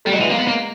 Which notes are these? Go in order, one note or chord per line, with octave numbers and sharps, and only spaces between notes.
G3 A3
F#3 G#3
E3
A#3
B3
A#3